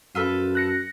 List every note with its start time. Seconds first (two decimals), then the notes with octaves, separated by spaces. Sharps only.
0.15 F#2 F4 A4 B4
0.55 F#6 A#6 C#7